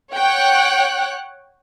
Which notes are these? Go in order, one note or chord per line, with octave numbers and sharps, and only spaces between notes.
C#5 F#5 G5 F#6